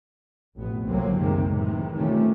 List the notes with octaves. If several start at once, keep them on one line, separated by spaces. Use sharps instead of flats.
A1 F2 B2 B3
C2 D3 F#3 A#3 C4
F#1 C3 D#3 G#3 A#3
A2 C3 D#3 E3
C3 D#3 F3 G3 A3 C#4